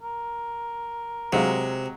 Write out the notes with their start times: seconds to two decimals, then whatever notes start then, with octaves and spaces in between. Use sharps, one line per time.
0.02 A#4
1.33 C3 F#3 G#3 F5